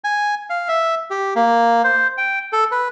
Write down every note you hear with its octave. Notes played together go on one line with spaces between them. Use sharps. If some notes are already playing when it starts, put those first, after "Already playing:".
G#5
F5
E5
G4
A#3
C5
G5
A4
B4